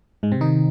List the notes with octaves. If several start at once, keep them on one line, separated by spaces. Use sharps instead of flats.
G#2 G#3
C3 C4
D#3 D#4